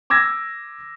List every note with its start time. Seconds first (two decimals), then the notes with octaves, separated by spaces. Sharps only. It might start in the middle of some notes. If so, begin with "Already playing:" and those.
0.10 D6 E6 G#6 A#6